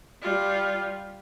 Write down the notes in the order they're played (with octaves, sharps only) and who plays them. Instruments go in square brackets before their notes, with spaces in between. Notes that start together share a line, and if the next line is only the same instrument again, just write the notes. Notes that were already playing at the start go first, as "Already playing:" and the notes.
[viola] G3 F4